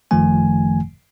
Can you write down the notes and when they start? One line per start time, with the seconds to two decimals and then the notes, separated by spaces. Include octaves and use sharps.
0.11 G1 F#2 D#3 F3 A3 G#5